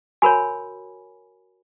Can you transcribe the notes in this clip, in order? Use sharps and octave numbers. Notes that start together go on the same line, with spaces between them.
F#4 A#4 C#5 G#5 B5